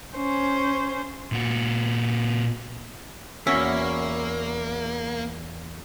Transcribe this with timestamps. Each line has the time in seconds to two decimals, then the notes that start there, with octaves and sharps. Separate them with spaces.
0.16 C#4 C5
1.32 A#2 F#4
3.47 E2 A#3 C#4 F#4 E5